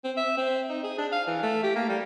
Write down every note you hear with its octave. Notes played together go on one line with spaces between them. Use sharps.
C4
E5
C4
D#4
G#4
D4
F5
E3
A3
G4
A#3
G3